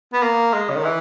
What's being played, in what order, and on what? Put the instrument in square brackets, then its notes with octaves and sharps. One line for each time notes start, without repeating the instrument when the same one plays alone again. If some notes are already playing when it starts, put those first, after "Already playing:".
[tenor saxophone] B3
A#3
G#3
C#3
D#3
E3